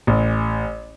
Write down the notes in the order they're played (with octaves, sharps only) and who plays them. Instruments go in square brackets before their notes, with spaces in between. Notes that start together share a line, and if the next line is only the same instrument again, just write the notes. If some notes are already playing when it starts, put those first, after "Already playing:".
[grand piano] A1